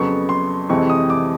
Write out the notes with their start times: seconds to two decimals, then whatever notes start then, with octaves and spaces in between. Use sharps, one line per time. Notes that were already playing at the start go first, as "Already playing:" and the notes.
Already playing: F2 C#3 F#3 B3 C#6
0.29 C6
0.69 F2 C3 E3 G#3 C4 C#6
0.90 D#6
1.10 D6